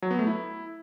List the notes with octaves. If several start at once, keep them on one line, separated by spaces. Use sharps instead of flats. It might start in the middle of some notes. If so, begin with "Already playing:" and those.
F#3
B3
A3
E4